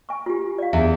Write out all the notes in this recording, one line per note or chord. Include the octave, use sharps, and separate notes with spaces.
G#5 C#6
F4 G4
D5 F5
E2 D4 E5